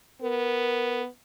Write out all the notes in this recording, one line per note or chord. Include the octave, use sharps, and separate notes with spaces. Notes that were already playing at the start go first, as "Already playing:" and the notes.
B3 A#4